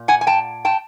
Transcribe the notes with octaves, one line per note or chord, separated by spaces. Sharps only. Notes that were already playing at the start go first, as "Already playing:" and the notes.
Already playing: A#2
F#5 G#5
G#5
G5 A5
G5 A5